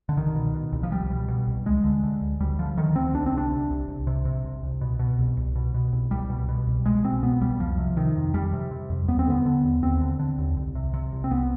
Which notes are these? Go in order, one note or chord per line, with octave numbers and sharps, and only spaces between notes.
D3
C2 D#3
B2
B2
C2
F3
C2 G3
B2
B2
C2
D2 G#3
D3
D3
D2
D2 G3
D3 F3
D3 D#3
D2 C4
C2 D4
C4
C3 D4
C3
C2
C2
C3
C3
C2
C2
B2
B2
C2
C2
B2
B2
C2
C2 G3
B2
B2
C2
C2 G#3
B2 C4
B2 B3
C2 G3
F2 F3
C3
C3 D#3
F2
F2 G3
C3
C3
F2
D#2 B3
C4
D3 B3
D3
D#2
D#2 C4
D3
D3
D#2
C2
C3
C3
C2
C4
C2 B3